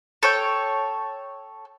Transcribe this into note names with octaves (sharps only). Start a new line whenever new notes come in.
A4 C#5 G5